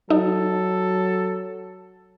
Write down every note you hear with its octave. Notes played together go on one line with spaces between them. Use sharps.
F#3 D#4 A4